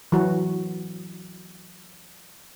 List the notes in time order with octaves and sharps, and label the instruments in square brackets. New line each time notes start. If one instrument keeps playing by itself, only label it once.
[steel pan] E3 F#3 F#4